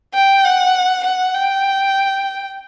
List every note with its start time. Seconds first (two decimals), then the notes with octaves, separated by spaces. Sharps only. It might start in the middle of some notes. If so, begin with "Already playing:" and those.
0.14 G5
0.44 F#5
1.04 F#5
1.35 G5